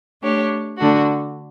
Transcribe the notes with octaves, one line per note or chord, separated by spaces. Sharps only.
A3 D4 G4 C#5
D3 A3 D4 F#4